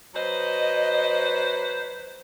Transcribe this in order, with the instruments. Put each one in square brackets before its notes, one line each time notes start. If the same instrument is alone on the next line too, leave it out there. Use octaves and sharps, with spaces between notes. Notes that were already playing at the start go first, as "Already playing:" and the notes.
[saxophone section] F#3 B4 C5 [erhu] D#5